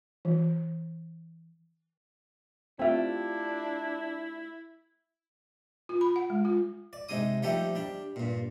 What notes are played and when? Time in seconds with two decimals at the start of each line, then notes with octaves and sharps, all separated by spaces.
0.25 E3
2.79 A3 C4 D4 E4 F4 G4 E5
5.89 F4
6.01 B5
6.16 F#5
6.30 G#3
6.45 F4
6.93 D5
7.09 C3 G#3 D#4 D#6
7.43 F3 G3 A3 D#4 G4 A4
7.75 G3 D4
8.16 G2 A#2